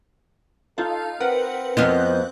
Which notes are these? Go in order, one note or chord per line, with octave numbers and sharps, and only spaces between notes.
D#4 F4 A4 F5
C4 A#4 B4 F#5
F2 B3 C4 F4 D#5 F#6 G6